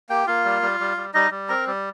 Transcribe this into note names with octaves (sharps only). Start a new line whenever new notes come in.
A#3 G4 G5
A#3 F4 F5
G3
G3
G3
G3
G3 D#4 D#5
G3
C4 A#4 A#5
G3